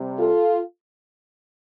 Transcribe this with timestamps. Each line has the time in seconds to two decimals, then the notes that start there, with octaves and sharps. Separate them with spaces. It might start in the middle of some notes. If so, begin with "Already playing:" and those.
Already playing: C3 G3
0.19 F4 A4